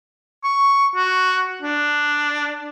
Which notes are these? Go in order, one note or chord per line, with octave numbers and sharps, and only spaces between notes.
C#6
F#4
D4